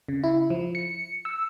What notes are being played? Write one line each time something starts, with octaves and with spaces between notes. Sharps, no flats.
C#3
E4
F3
C#7
E6